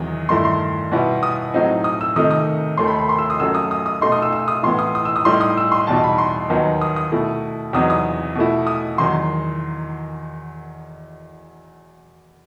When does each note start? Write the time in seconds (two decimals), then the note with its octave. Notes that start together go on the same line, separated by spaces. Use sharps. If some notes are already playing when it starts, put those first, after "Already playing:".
Already playing: E2 C3 D#3 F#3 D#6
0.29 G2 D#3 A3 E4 C6
0.45 C6
0.92 B2 G3 B3 E4
1.23 D#6
1.54 A2 F#3 C4 D#4
1.84 D#6
2.01 E6
2.16 C3 D#3 A3 D#4 D#6
2.31 D#6
2.78 D#2 D#3 A3 C6
2.88 B5
2.98 B5
3.09 C6
3.19 E6
3.30 D#6
3.40 F#2 F#3 A3 E6
3.55 D#6
3.71 D#6
3.86 D#6
4.01 B2 A3 D#4 C6
4.12 D#6
4.22 E6
4.32 E6
4.48 D#6
4.63 A2 E3 B3 C6
4.79 D#6
4.95 D#6
5.05 E6
5.16 D#6
5.25 A2 G3 D#4 C6
5.41 D#6
5.57 E6
5.72 C6
5.87 E2 B2 G3 D#4 A5
6.04 B5
6.18 C6
6.49 D#2 D#3 F#3 B3 D#4
6.81 D#6
6.96 D#6
7.12 B2 A3 E4
7.73 E2 C3 F#3 B3 D#4 D#6
7.90 D#6
8.35 B2 A3 E4
8.67 D#6
8.98 E2 D#3 F#3 C6